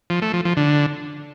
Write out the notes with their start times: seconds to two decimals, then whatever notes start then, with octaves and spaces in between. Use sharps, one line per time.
0.10 F3
0.22 A3
0.33 F3
0.45 F3
0.57 D3